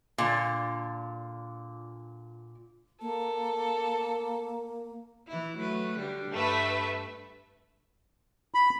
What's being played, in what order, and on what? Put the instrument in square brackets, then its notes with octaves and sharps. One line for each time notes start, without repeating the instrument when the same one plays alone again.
[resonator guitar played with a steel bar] A#2 D3
[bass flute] A#3 [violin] A4
[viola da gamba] E3 E4
F#3 A3 B4
D3 G3 D4
[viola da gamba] G2 [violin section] A3 B4 E5
[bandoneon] B5